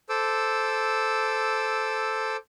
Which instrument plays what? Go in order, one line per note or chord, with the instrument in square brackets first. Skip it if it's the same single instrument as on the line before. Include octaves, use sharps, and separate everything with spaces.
[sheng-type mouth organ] A4 C5 D6 E6